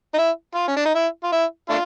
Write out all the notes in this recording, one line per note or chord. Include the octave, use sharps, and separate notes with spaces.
D#4
E4
F4
C#4
D4
D#4
E4
F4
E4
A3 D4 F4